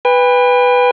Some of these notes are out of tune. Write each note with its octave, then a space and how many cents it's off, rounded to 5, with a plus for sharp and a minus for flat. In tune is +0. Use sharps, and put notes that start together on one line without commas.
B4 +0 G5 +45